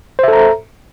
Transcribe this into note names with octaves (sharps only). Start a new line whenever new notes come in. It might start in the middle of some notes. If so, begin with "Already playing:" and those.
A4 C5 E5 A#5